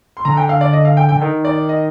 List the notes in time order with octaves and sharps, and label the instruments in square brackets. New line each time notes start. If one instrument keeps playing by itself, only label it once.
[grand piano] C6
[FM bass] D3 [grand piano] A#5
[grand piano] G5
F5
D5
D#5
F5
G5
[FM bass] D3 [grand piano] G5
[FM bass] D#3
[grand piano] D5
D#5